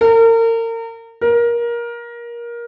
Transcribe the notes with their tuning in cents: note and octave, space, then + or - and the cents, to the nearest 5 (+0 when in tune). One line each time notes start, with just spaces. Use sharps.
A#4 -35
A#4 +20